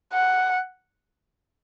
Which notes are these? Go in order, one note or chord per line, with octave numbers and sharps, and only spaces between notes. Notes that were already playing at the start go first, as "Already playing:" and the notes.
F#5